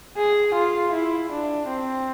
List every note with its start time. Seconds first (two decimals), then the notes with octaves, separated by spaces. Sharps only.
0.17 G#4
0.54 F4
0.92 E4
1.31 D4
1.68 C4